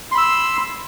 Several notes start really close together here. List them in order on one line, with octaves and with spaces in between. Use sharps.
C6 B5 E6